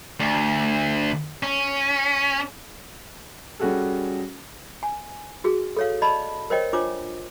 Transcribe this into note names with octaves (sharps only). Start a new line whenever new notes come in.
D2
C#4
G3 C#4 F#4 G#4 A4
G#5
F#4 G#4
A4 C#5 F5
D5 D#5 A5 B5
A#4 C5 C#5 D#5 G5
D4 F4 C5 C#5 D6